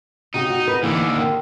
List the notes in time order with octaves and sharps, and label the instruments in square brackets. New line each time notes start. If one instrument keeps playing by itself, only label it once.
[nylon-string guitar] C#3 F#4 G4 [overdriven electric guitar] D#4
[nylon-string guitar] F#4
B4
[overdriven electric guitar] D#2 D3 [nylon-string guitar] E3 B3
[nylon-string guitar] D#3